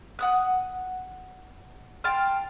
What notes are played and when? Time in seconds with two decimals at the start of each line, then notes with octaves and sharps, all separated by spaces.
0.19 F#5 D#6 F#6
2.04 G5 A5 C6 F6